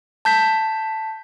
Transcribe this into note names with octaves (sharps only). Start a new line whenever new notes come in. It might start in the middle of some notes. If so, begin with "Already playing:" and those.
A5 G6 B6